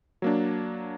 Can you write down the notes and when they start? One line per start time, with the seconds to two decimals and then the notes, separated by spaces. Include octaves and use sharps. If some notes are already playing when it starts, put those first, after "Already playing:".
0.22 F#3 A#3 D4